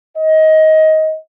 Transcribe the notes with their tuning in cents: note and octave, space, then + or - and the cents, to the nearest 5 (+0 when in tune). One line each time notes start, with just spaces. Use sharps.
D#5 +20